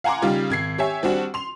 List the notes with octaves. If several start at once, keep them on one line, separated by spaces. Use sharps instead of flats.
F5 F#5 G#5 A#5 C6 D6
C#3 G3 D#4 F4
G#1 G#6 C7
G4 C#5 E5 G#5
G3 C4 D4 F#4
C6 F7